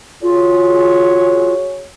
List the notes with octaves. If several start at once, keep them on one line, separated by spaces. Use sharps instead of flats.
F4 F#4 G#4 C#5